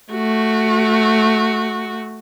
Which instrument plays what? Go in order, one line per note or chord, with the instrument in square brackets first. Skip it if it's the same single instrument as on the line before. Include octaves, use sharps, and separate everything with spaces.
[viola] A3 F#4